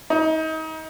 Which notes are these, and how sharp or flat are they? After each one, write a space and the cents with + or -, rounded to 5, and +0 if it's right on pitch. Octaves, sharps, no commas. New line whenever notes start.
D#4 +30